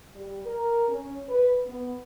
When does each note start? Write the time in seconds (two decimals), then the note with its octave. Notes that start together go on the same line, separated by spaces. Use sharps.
0.15 G3
0.45 A#4
0.89 C#4
1.29 B4
1.66 B3